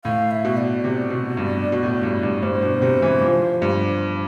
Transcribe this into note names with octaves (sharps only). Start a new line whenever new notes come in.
A2 F5
E5
B2
D5
C3
B2
G2
B2
A2
G2
G2
G2 C5
B2
C3
E3
F3
G2